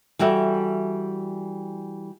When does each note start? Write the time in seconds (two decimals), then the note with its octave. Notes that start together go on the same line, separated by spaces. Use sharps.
0.19 E3 G3 F#4 A4 E5